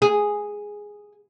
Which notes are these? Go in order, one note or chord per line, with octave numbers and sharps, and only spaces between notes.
G#4